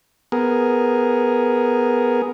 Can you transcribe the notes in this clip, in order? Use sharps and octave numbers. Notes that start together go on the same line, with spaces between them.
B3 G#4 A#4